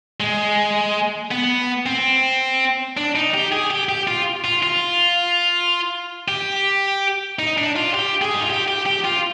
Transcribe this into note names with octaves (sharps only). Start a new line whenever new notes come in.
G#3
B3
C4
D4
D#4
G4
G#4
G4
G4
F4
F4
F4
G4
D#4
D4
F4
G4
G#4
D#4
F4
G4
G4
G4
F4